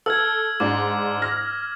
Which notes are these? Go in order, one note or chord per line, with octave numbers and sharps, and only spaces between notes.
A4 E6 F6 G#6
G#2 D4 D6
F6 A#6